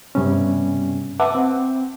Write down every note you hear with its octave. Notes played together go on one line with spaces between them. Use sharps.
G2 C3 G3 B3 C#4
B4 E5 F#5 A5 D6
C4